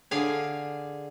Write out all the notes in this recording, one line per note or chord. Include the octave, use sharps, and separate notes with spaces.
D3 G#4 F5 G#5